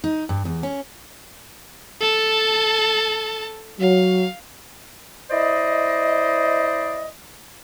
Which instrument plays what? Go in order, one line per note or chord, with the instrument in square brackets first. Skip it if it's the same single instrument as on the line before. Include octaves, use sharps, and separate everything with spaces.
[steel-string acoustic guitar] D#4
G2
E2
C#4
[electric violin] A4 A5
[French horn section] F#3 [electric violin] F5
[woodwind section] E4 C5 D5 D#5